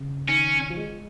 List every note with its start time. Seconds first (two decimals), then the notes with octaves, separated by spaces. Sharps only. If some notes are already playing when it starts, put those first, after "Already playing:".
Already playing: C#3
0.28 D#3 C#4
0.70 F3
0.77 G#3